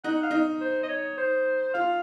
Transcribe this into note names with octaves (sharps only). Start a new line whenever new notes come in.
D#4 F#5
F5
D#4
C5
D#5
C#5
C5
F4 F5